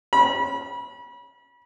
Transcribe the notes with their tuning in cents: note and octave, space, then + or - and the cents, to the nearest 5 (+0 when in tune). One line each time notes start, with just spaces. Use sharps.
B5 -35